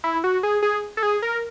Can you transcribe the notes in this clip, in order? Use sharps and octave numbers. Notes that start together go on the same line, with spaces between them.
E4
F#4
G#4
G#4
A4
G#4
A#4